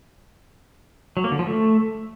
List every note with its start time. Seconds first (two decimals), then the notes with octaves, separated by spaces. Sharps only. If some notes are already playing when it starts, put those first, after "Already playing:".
1.17 F#3
1.24 A#3
1.32 D3
1.39 F3
1.47 A3